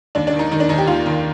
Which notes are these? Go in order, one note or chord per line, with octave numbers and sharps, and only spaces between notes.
D#2 D4
D4
D#3
D#4
D#3 D#4
D4
D#2 D#4
G4
D#2 F4
D#3